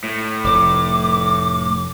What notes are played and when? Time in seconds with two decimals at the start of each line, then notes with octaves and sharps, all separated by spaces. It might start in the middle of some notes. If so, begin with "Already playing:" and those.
0.04 A2
0.44 F1 D6